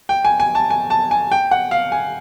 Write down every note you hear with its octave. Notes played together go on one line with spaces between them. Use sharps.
G5
G#5
G#5
A5
G#5
A5
G#5
G5
F#5
F5
G#5